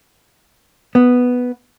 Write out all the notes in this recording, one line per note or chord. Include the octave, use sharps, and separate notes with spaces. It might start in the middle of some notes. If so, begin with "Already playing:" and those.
B3